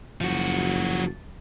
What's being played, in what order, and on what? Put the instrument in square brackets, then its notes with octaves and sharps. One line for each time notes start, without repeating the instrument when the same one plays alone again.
[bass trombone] F#1 [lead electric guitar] F3 F#4